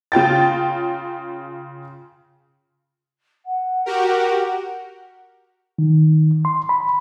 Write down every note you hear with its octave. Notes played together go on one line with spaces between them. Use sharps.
C#3 F4 G5 A6
F#5
F#4 G4 A#4
D#3
C6
B5